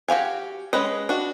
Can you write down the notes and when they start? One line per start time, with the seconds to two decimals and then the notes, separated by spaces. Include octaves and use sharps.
0.08 F#4 G4 F5 G#5
0.73 G#3 C#4 B4 D#5
1.09 D4 F#4